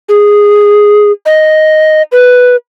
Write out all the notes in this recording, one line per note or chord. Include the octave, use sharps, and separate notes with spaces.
G#4
D#5
B4